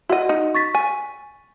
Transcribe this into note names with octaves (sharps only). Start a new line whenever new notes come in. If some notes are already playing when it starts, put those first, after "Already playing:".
E4 F#4 D#5 F#5
D#4
C#6 A6 B6
G#5